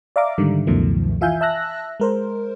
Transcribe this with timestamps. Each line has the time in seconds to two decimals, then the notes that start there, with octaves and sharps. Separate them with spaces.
0.16 D5 E5 F5 A#5 D6
0.38 G#2 D3 D#3 G3
0.67 C#2 F#2 B2 D#3 F3 A3
1.21 E3 F4 E5 F5 G#5 G6
1.41 E5 A5 E6 F#6 A#6
2.00 G#3 A#4 C5